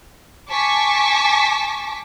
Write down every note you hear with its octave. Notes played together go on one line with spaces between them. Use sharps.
G#5 A5 C#6 D6 B6